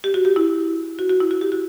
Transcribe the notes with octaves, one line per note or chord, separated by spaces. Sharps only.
G4
F#4
G4
E4
F#4
F#4
E4
F#4
G4
F#4